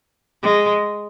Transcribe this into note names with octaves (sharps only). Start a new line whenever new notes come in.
G#3